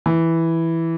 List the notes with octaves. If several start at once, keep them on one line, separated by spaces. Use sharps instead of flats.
E3